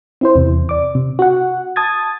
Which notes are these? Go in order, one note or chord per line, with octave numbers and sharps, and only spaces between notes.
C4 E4 C5
E2 C3
D5 D6
C3
F#4 F#5
A5 D#6 G#6 A6